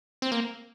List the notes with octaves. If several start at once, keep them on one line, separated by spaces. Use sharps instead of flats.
C4
A#3